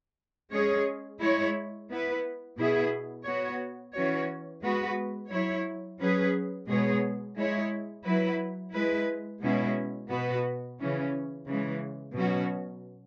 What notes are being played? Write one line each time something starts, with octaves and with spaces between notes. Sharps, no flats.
G#3 C#4 G#4 C#5
G#3 E4 C#5
B3 E4 B4
B2 B3 E4 G#4
B3 F#4 C#5
E3 C#4 F#4 C#5
G#3 B3 F#4 B4
F#3 E4 C#5
F#3 C#4 G#4 B4
B2 G#3 B3 G#4 C#5
G#3 E4 C#5
F#3 E4 B4
G#3 E4 B4
B2 G#3 C#4 E4
B2 B3 F#4 B4
C#3 E3 C#4
C#3 E3 G#3
B2 F#3 C#4 F#4